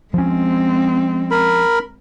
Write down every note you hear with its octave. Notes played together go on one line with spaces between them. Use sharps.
F3 G#3 C4 C#4
A#4 B5